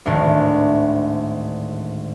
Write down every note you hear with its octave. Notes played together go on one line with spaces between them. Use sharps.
G#1 D2 A2 D3 D#3